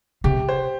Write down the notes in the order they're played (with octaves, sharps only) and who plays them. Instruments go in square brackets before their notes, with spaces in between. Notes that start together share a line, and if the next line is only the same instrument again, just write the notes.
[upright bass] C3 [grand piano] G4
[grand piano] C5